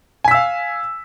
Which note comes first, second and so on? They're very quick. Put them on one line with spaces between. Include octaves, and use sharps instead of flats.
G#5 B6 E6 F5